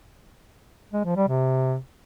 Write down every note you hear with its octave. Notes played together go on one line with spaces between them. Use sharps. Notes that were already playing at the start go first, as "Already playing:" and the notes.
G#3
F3
G3
C3